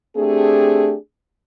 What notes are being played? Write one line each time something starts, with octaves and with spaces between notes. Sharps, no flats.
A3 C4 D4 G4 G#4